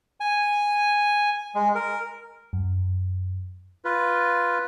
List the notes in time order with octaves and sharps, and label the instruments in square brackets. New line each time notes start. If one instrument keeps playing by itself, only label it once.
[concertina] G#5
G#3
A#4
[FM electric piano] F#2
[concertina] F4 B4